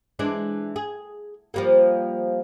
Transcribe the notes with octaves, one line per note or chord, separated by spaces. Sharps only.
E3 G#3 D4
G#4
F3 G3 A#3